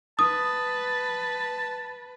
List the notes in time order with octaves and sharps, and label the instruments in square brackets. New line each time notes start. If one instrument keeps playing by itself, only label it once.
[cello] B4 [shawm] A5 [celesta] D#6